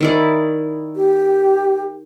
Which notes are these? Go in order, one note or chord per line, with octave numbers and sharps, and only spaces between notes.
D#3 E4 D5
G4